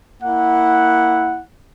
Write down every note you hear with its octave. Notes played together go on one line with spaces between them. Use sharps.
A#3 E4 F#5